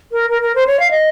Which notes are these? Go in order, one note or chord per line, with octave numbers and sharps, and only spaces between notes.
A#4
A#4
A#4
C5
C#5
F5
D#5